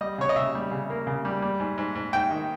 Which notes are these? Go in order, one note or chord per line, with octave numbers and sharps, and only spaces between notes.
G3 D#5
C#3 C#5
D#5
C#3 E5
G3
C#3
A#3
C#3
G3
G3
G#2
G#2
G#2
G#2 G5
D#3